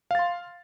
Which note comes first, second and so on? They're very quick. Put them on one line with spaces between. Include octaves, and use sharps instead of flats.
F5 A6 C6